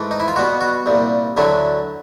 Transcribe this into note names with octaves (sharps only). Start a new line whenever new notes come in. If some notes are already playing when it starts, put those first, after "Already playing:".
Already playing: G#2 E3 A3
D#4
E4
F4
B2 G3 B3 F#4
F#4
C2 A#2 G3
D2 D3 F#3 A3 E4